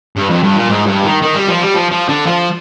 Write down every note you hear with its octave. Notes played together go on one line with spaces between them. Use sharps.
G2
F2
G2
A#2
G#2
G2
D#3
D#3
G3
F3
G3
F3
F3
D3
F3